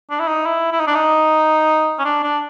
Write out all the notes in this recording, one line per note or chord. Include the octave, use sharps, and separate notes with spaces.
D4
E4
D#4
E4
E4
D#4
D4
D#4
C#4
D4
D4